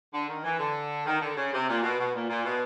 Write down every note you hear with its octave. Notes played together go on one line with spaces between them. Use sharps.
D3
D#3
E3
D3
D#3
D3
C#3
C3
A#2
B2
B2
A#2
A#2
B2